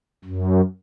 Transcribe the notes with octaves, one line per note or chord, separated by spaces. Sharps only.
F#2